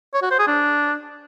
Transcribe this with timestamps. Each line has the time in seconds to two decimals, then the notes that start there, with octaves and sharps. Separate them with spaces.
0.14 C#5
0.22 F#4
0.30 C5
0.39 G#4
0.47 D4